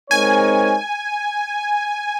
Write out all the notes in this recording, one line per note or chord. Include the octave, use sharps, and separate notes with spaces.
G#3 C4 D#4 A#4 C#5 G#5